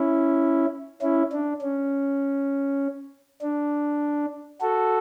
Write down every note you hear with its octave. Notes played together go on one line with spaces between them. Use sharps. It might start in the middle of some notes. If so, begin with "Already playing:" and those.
Already playing: C#4 E4
C#4 E4
D4
C#4
D4
F#4 A4